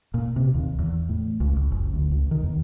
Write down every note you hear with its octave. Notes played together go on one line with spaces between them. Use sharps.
A#2
C3
D#2
E2
A2
C#2
C#2
F#1
D2
C#2
D#3
E2